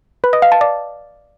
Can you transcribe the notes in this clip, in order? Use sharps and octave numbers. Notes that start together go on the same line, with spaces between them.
B4
D#5
F5
A5
D5